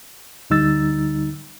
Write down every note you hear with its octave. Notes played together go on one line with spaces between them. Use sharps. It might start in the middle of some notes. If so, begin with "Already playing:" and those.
D2 D3 G3 D#4 E6 A6